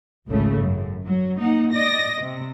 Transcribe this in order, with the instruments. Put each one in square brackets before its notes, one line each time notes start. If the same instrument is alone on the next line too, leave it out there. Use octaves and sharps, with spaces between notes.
[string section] G#1 C#2 C#3 A3
F#2
F#3
A#3 D#4 F#5
D5 D#5 A#6
C3